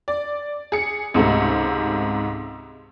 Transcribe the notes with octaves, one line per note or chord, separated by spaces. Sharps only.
D5
G#4 C#7
C#2 G#2 C3 A3